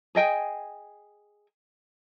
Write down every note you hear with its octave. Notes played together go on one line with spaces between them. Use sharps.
G#4 D#5 G5 G#5